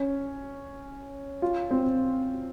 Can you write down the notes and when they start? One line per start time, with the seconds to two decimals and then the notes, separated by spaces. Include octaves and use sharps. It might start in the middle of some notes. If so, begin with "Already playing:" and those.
Already playing: C#4
1.42 F4
1.71 C4